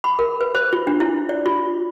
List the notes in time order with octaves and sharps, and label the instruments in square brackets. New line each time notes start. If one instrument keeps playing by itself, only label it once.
[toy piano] B5
A#4
B4
C5
F4
D4
E4
D5
F4